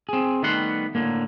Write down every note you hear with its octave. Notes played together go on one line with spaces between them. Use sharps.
C4 G#4
D#3 G3 A3 B3 F#5 C6
A2 D3 A#3